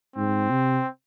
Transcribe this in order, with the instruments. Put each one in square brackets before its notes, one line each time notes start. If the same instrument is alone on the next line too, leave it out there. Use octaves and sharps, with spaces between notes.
[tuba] G#2 [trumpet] C4
[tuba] C3